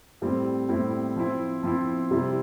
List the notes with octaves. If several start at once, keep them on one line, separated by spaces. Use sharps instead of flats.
A2 G3 C4 E4
A2 G3 C4 E4
F3 C4 E4
F3 C4 E4
C3 G3 C4 E4